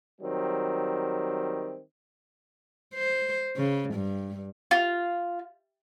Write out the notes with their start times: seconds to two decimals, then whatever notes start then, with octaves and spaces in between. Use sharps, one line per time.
0.21 D#3 F#3 G3 C4
2.94 C5
3.56 C#3
3.94 G2
4.71 F4